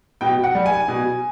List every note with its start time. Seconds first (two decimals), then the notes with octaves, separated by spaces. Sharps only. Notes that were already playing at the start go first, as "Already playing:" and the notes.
0.21 B2 G5
0.44 F#5
0.55 G3
0.66 G#5
0.88 B2